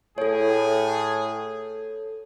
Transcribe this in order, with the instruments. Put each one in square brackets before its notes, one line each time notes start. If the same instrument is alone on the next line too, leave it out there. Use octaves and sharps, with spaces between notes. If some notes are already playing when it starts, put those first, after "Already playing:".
[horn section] A2 G#4 [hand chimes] A4 C#5